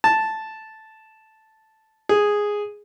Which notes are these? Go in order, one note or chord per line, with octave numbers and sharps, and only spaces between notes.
A5
G#4